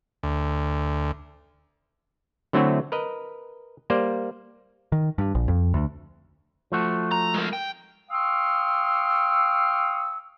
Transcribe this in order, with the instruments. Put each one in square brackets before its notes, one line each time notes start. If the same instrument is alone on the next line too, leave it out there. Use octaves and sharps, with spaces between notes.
[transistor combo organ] D2
[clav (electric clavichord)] D3 F#3 A3 C4 E4 F#4
A#4 B4 D#5
G3 A#3 C5 D5
[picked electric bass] D#3
G2
A#1
F2
D2
[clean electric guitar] F3 A3 F#4
[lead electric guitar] A#5
G#3 A#4
G5
[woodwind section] F5 G5 C6 C#6 D#6 E6